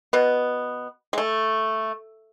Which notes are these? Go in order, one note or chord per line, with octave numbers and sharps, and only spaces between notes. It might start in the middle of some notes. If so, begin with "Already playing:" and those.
B2 B3
G#3
A3